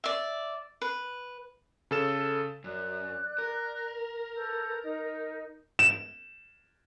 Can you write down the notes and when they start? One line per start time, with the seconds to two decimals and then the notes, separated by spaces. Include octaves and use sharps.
0.04 D5 E5
0.81 B4
1.91 C#3 A4 E7
2.64 F#2 D5 F#6
3.38 A#4
4.33 A4 B4 G6
4.82 D#4
5.79 E7